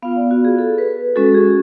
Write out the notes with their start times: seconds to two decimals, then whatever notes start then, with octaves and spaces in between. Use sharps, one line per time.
0.02 B3 F4 F5
0.16 D5
0.31 F#4
0.45 G#4
0.58 A4
0.78 B4
1.16 G#3 C#4 F#4 A4
1.34 G#4